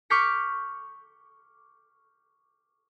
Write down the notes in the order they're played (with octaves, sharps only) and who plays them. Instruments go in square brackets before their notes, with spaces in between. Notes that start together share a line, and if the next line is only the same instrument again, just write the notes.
[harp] C#6 D6 F6 G6 B6 C#7